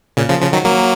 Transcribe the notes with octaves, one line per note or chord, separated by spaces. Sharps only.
A#2 C#3
C#3 F3
C#3 F3
D#3 F#3
F#3 A#3